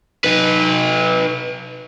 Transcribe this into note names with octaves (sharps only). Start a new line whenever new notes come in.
D#4 B4